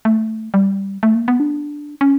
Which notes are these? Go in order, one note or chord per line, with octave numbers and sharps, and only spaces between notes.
A3
G3
A3
A#3
B3
D4
C#4